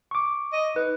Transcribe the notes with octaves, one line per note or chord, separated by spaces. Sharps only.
C#6 D6
D#5
D#4 B4